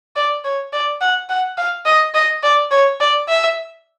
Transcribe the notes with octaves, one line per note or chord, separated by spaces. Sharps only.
D5
C#5
D5
F#5
F#5
F5
D#5
D#5
D5
C#5
D5
E5